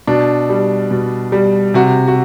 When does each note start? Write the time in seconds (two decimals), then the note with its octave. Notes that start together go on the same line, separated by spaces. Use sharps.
0.07 B2 D4
0.49 G3
0.91 B2
1.32 G3
1.74 C3 F#4
2.08 F#4